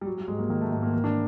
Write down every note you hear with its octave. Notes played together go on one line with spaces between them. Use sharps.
G3
F#3
G3
G#2 G#3
A#3
D#3 A#3
A3
G#2 A3
A#3
E3 A#3
D4